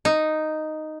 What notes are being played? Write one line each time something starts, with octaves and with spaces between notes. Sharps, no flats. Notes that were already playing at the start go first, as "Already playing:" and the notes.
D#4